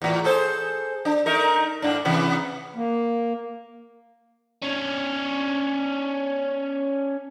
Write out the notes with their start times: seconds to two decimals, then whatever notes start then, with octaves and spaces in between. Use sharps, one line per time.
0.02 E2 A2
0.24 G#4 A4 C5
1.05 D4
1.26 A3 D#4 A#4
1.82 G#2 D4
2.05 C3 E3 B3
2.76 A#3
4.62 C#4 D4